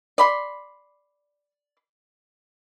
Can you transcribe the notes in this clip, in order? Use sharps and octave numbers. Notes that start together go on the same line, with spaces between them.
D5 B5 C6